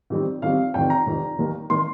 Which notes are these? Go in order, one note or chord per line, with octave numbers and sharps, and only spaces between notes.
F2 D#3 G3 C4
F2 D#3 G3 C4 F5
F1 F2 D#3 G5
A#5
F1 F2 D#3
D#2 D#3 A#3
D#3 A#3 C6